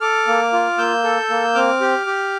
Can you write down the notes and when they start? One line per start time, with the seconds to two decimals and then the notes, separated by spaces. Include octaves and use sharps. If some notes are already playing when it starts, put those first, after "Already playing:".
0.01 A4 D6 F6
0.27 A#3
0.53 F4
0.78 A#3 E6 G6
1.04 A4
1.30 A#3
1.55 C4 D6 F6
1.81 G4
2.06 G4